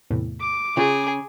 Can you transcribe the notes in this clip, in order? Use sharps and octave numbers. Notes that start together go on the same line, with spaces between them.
E2 A2 C3
D6
C#3 F4 G#4